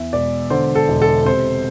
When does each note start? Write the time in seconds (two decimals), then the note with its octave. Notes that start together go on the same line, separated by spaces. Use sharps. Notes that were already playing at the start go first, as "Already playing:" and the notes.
Already playing: E2 E5
0.13 E1 D5
0.50 D3 C5
0.75 A4
0.88 E1
1.02 A4
1.25 C3 C5